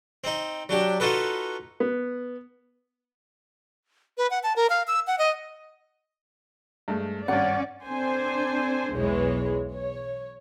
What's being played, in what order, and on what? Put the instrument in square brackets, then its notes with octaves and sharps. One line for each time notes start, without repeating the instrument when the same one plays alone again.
[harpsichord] C4 D#4
F#3 D4 G4
D#4 F4 F#4 A4 B4
[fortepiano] B3
[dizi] B4
F#5
A5
A#4
F5
E6
F#5
D#5
[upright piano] G2 G#3 A3
[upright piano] G#1 G2 [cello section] C#4 D5 [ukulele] F#5
[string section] C4 D4 A4 C5 G#5
B1 E2 E3 G#3 C#5
C#5